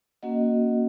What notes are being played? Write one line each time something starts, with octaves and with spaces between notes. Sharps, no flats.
A#3 C#4 F#4 D#5 F#5